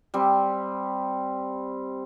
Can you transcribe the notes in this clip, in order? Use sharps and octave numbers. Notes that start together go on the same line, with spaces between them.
G3 C4